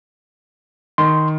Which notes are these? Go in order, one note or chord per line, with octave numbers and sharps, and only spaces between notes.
D#3 C6